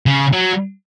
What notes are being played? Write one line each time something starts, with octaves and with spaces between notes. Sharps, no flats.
C#3
F#3